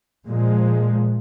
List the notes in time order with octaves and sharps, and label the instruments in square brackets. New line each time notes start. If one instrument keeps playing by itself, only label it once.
[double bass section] A#2 F3 G#3